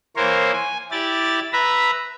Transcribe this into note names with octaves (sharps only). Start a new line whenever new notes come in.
E3 A#3 A#4 C5 C#5
G#5
E4 G4 D5 A6
B4 E5 A#5 B5